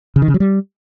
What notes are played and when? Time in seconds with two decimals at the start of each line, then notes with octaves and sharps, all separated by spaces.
0.16 C#3
0.22 D#3
0.28 C#3
0.34 F#3
0.40 G3